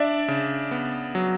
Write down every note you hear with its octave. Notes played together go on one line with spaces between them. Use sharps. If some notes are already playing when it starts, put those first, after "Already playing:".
Already playing: D4 D5 E5
C#3
B3
F#3